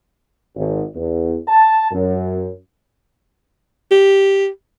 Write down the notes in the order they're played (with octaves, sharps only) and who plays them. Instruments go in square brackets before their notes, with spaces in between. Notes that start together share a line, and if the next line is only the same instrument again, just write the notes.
[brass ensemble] G#1
E2
A5
F#2
[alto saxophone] G4